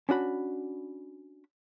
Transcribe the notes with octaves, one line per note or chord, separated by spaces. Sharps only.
C#4 D4 F#4 B5